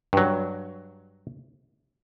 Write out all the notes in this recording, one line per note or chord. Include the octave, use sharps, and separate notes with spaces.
G2 F#3